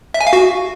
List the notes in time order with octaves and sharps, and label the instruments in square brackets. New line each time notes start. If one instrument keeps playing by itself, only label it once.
[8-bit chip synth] E5
G#5
F5
F#4